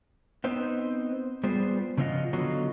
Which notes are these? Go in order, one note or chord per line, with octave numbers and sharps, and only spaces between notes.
B3 C4 D#4 C5
G3 B3 F4 G#4 C5
C#3 F3 C4 F4 D#5 F#5
D3 F#3 B3 F4 F#4 D#5